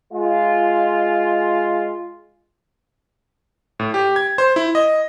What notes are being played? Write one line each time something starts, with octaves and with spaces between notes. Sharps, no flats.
G#3 F4
A2
G4
G#6
C5
E4
D#5